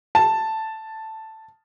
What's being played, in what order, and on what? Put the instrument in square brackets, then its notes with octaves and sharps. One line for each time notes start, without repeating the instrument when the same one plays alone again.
[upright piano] A5